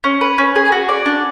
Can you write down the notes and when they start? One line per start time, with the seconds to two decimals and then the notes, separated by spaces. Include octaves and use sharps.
0.04 C#4
0.21 B4
0.38 C#4
0.56 G#4
0.72 F#4
0.89 D5
1.06 D4